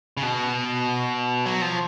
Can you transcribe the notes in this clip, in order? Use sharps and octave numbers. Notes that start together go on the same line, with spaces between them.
C#3
B2
F#3
F3